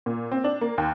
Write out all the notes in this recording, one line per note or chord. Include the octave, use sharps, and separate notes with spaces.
A#2
C4
D4
A#3
D#2